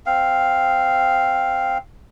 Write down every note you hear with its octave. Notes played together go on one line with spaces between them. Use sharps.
C4 F5